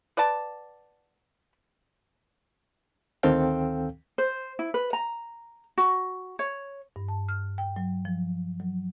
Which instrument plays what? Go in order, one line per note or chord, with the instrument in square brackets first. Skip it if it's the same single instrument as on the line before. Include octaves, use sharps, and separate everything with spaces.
[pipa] B4 D5 F#5 A5
[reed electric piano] D2 D#3 C4 A4 F5 G5
[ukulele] C5
E4
B4
A#5
F#4
C#5
[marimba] G2
A5
F6
G5
F#3
F3
F#3